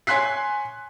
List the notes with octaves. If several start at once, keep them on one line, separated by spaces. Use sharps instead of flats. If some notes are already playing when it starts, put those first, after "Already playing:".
C#5 G#5 C6 F#6 B6 C7